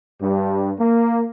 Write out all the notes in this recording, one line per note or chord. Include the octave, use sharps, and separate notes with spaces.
G2
A#3